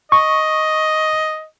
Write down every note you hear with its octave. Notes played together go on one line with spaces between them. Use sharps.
D#5 C#6